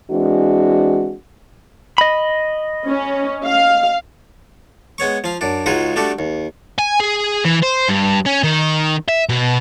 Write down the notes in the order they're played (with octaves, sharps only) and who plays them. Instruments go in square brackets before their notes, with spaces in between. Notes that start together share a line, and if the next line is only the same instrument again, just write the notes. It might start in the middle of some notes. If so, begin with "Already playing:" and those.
[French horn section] E3 G#3 C4 D4 F#4
[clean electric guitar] D#5 B5
[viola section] C#4
F5
[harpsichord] G#3 B3 C#5 C#6
F3 F5
F#2 D4
C#2 G#3 D#4 F4 F#4 C#6
G3 A3 D4 F#4 G4
D#2
[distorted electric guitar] G#5
G#4
E3
C5
G2
C#4
D#3
E5
B2